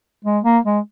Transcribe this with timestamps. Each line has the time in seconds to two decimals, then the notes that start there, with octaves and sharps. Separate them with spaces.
0.25 G#3
0.44 A#3
0.65 G#3